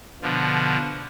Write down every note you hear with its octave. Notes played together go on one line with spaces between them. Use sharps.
B2 D3 F3